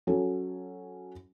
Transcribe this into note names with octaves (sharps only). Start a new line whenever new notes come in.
F#3 C#4 A4